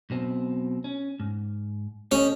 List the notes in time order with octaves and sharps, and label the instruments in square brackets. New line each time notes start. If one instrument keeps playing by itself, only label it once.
[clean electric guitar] B1 B2 C4
C#4
G#2
[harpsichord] C#4 [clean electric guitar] G4 A4 D#5